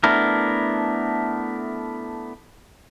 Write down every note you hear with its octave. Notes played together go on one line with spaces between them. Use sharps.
A3 B3 D4 E4 A#4